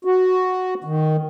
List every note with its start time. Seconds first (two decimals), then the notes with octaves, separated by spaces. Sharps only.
0.05 F#4
0.84 D#3